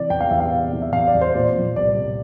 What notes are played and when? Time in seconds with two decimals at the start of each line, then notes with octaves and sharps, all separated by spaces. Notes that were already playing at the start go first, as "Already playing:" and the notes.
Already playing: C3 E3 D5
0.10 E2 G5
0.21 F5
0.31 E2 E5
0.40 F5
0.52 C3
0.73 E3
0.82 E5
0.93 E2 F5
1.07 D5
1.15 E2
1.21 C5
1.35 A#2 D5
1.56 F3
1.76 C2 D5
1.97 C2